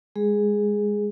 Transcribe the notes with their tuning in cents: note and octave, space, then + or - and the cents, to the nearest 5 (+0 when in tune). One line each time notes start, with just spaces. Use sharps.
G#3 -15 G#4 +0